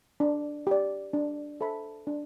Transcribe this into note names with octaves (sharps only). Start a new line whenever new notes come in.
D4
G4 D5
D4
A4 C5 E5 B5
D4